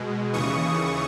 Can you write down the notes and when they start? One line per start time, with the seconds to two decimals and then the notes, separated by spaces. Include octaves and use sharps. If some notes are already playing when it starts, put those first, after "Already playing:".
Already playing: B2 G#3
0.33 D#2 C#3 E3 C#6 D#6